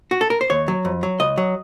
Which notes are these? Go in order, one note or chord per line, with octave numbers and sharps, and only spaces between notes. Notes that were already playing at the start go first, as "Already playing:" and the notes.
F#4
A4
A#4
C5
D#2 C#5
F#3
F2
F#3
C#2 D#5
F#3